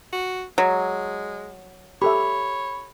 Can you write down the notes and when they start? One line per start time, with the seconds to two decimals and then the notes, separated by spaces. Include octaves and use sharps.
0.12 F#4
0.58 F#3 G#3
2.02 G4 A4 C#5 E5 B5